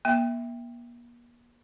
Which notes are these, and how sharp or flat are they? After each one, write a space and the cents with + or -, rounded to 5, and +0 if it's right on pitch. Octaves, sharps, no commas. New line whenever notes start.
A#3 +45 E5 +0 G5 +15